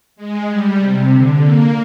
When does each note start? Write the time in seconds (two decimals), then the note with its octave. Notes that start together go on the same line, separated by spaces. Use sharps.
0.16 G#3
0.48 G3
0.79 C3
1.11 D3
1.42 A#3